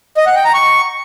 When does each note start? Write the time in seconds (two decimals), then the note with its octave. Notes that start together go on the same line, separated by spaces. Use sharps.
0.17 D#5
0.26 F#5
0.35 G5
0.45 A#5
0.54 C#6